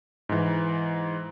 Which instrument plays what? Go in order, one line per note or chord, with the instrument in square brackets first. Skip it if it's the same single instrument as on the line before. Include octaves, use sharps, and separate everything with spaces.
[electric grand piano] G#2 E3